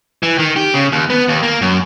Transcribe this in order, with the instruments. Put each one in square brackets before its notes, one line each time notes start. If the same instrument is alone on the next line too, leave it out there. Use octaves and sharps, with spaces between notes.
[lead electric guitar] E3
D#3
G4
C#3
D#2
B3
D#2
A#3
F#2